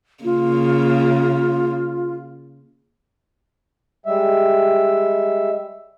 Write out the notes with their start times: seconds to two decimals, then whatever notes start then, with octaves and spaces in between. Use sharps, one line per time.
0.24 C#3 A#3 F4
4.06 G3 G#3 E5